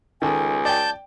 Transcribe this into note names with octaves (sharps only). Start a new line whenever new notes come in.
C#2 D#3 A4 G#5
D5 G5 A5 G6